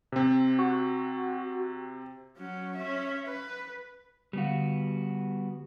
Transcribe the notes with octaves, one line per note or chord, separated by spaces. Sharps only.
C3 C4
F#4
F#3 C#4
C#4 E5
B4
D3 G3 B3 F#4 F5